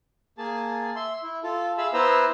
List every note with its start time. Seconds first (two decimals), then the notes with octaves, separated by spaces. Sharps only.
0.38 A#3 G#4 A5
0.96 E5 C6
1.23 E4
1.43 F4 A4
1.78 G#4 E5 F5 B5 E6
1.93 B3 E4 B4 C5 A#5 E6